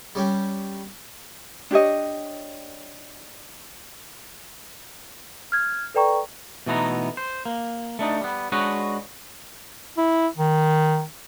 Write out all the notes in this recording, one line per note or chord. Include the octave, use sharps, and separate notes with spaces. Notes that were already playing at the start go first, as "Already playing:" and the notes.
G3 C#4 G4
D4 G4 C#5 D#5
F6 G#6
A4 B4 D5 G5 A#5 C#6
B2 E3 A3 B3 D#4 A#5
C5
A#3
A3 D4 D#4
G3 B3
G#3 D4 F#4 B4 C#5 D#5
E4
D#3